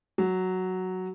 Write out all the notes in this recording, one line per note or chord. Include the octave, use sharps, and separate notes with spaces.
F#3